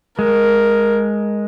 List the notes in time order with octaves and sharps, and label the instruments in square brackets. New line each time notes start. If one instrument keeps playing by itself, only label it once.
[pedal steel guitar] G#3 [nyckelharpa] A#4